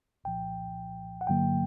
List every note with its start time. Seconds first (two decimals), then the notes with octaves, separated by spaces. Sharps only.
0.24 C2 A#2 F3 G5
1.21 F#5
1.27 G2 D3 F#3 A#3 G5